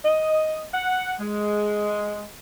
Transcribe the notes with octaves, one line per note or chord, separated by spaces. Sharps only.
D#5
F#5
G#3